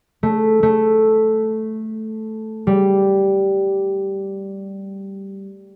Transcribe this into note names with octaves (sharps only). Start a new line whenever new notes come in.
A3
A3
G3